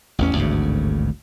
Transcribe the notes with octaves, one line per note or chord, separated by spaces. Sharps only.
A1 E2 C#4
G#1 D2 G2 C#3